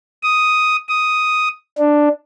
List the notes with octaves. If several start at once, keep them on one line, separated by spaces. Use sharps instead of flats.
D#6
D#6
D4